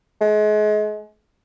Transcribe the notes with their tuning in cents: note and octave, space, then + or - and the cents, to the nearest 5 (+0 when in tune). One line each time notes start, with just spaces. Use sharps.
G#3 +35